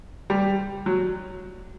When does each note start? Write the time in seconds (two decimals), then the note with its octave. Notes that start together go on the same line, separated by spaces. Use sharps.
0.30 G3
0.86 F#3